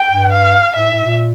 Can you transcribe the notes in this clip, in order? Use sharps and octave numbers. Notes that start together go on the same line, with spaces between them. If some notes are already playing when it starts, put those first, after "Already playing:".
Already playing: G5
G2
F5
A2 E5
A2
A#2